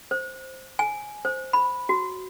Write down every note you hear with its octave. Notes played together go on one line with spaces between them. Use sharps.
C5
G#5
C5
B5
F#4